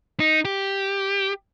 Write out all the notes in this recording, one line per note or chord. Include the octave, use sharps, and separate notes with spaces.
D#4
G4